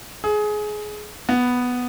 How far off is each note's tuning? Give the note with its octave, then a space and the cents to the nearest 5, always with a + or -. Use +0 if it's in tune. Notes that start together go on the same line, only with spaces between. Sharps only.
G#4 +20
B3 +0